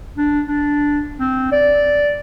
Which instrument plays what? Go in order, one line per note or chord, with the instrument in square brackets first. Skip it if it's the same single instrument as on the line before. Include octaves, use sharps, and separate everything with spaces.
[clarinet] D4
D4
C4
D5